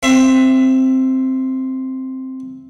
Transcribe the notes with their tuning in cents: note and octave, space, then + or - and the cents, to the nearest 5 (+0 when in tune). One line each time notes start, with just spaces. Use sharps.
C4 +0 E5 +20